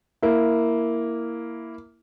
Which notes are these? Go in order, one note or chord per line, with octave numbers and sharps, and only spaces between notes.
A#3 E4